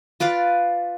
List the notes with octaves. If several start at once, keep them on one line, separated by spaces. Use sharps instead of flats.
F4 B4 D5 F5